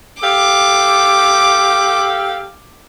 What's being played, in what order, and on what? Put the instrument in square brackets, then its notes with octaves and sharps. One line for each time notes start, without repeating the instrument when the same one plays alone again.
[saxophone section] G4 A4 F5 [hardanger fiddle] D6